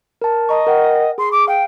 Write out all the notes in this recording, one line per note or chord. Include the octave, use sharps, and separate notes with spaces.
A#4 A5
D#5 A#5 C#6
A#4 F#5 G5
G#4 C6
D6
F5 G5